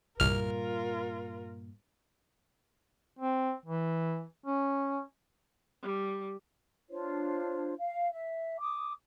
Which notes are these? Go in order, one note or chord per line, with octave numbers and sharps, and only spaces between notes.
C2 G2 A#2 F4 A#4 F6
C4
E3
C#4
G3
D4 F4 C5 C#5
F5
E5
D6 D#6